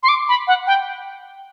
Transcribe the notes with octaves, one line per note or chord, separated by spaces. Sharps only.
C6
D6
B5
F#5
G5